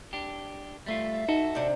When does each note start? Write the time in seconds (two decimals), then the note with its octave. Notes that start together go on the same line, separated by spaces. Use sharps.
0.13 D4 G4
0.86 G3 A3 F4 E5
1.28 D#4 F#4 A4
1.55 C3 D4